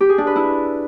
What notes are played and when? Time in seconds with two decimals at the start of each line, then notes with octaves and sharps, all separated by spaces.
0.01 G4
0.09 G#4
0.18 D4
0.27 B4
0.36 E4